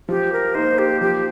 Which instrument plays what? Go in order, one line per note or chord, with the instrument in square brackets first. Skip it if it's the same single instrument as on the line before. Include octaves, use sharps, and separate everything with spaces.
[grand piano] F3 [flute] G4
[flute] A#4
[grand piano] A#3 D#4 [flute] C5
[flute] G4
[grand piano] F3 [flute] G4